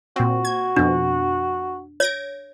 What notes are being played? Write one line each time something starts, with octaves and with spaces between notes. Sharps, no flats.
A#2 C4 F#4
G#6
F2 B2 D4
C#5 G#6 A#6 D7